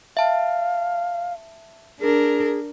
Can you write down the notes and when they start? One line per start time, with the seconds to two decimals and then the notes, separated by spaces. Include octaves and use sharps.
0.17 E5 F5 A5
2.01 D4 G#4 A#4